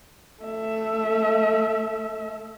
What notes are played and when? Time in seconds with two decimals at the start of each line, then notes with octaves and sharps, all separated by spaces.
0.43 A3 E5